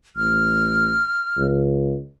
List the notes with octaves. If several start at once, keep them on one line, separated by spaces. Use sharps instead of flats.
A1 F6
C#2